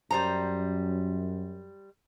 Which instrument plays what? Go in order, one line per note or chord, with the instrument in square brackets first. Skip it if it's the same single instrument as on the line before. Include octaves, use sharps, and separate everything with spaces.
[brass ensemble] F#2 [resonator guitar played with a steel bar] G3 C5 A#5